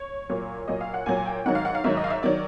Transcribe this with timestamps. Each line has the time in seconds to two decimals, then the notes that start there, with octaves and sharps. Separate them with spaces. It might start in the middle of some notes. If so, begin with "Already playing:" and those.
Already playing: C#5
0.29 A#2 F#3
0.68 A#2 F#3 D#5
0.81 F5
0.94 F#5
1.06 A#2 F#3 G#5
1.17 G#5
1.26 G5
1.46 G#2 D#3 F#3 F#5
1.55 F5
1.65 F#5
1.75 F5
1.84 G#2 D#3 F#3 E5
1.97 D#5
2.04 F5
2.10 E5
2.23 D#3 F#3 D5